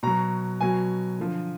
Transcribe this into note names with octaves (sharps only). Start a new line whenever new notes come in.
B2 F#3 A#5
B2 F#3 G#5
D3 F3